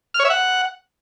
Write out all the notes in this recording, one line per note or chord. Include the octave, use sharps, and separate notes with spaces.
F6
C#5
E5
F#5